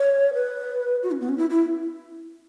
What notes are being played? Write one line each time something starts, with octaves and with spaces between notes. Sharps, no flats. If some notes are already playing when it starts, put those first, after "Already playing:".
Already playing: C#5
B4
F#4
C#4
B3
C#4
E4
E4